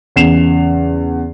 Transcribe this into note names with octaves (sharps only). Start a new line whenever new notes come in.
E2 C#3 C7 E7 F7